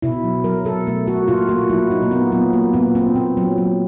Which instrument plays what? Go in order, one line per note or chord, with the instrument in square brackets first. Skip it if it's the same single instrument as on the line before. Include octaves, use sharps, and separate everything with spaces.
[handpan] B2 E4
F#3
F#3 A#4
B2 A4
A3
A3 F#4
A#2 F4
A#3 F#4
F#3 E4
A#2 D#4
A#3
A#2 B3
F#3 B3
A#3
A#2 B3
A#2 C4
A#2 C4
F#3
F#3